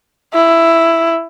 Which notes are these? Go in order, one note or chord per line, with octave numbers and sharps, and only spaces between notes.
E4